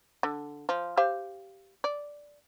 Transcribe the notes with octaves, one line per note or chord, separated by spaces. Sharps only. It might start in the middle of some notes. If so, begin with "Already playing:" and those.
D3
F3
G4 C5 F5
D5